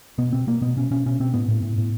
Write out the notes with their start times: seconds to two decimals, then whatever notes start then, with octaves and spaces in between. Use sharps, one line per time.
0.18 B2 B3
0.33 B2 C4
0.47 B2 A#3
0.61 B2 B3
0.77 B2 C#4
0.91 B2 C#4
1.06 B2 C#4
1.20 B2 C4
1.34 A2 B3
1.48 A2
1.63 A2
1.78 A2